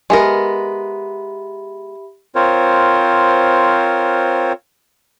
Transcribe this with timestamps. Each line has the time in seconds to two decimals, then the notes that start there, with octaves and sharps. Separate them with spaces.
0.10 G#3 B3 G4 A#4 E5 B5
2.35 C4 F4 A#4 C5 C#5